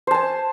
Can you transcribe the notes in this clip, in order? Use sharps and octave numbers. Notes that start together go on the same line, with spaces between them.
C5 G#5 A5